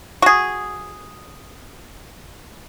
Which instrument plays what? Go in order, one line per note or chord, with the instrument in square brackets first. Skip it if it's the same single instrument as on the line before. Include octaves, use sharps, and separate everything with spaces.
[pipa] F#4 G#4